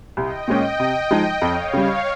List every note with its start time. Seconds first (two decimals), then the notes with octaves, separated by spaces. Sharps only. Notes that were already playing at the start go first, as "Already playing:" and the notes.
0.16 C2 D#5 G5
0.48 A#2 G#3 C#4
0.80 C3
1.11 F3 G#3 D#4
1.42 F2 C#5 F5
1.73 C#3 G3